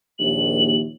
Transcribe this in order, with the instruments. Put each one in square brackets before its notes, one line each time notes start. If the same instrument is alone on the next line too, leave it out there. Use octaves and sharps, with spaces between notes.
[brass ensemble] A#1 D#2 [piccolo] F#7